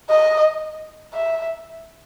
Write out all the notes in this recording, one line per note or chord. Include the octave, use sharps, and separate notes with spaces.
D#5
E5